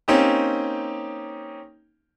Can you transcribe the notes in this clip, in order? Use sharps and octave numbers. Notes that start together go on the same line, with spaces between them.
A#3 C4 C#4 D#4 G4